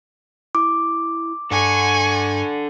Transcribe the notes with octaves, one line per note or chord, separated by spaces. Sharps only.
E4 D6
G2 D4 A4 G#5 C#6